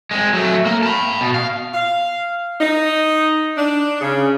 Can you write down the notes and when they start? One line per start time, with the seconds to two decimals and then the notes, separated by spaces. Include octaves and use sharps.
0.11 G#3 C4
0.34 F#3 A3
0.66 A#3
0.83 A5 B5
1.21 B2
1.34 F5
1.74 F5
2.61 D#4
3.57 D4
4.01 C#3